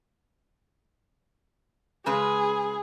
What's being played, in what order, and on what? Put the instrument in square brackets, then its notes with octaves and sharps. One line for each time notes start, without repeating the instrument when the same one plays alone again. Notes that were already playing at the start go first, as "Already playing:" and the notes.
[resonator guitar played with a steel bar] C#3 G#3 B4 [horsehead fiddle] G#4